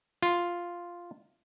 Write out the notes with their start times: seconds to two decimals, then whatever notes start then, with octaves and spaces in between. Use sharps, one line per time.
0.23 F4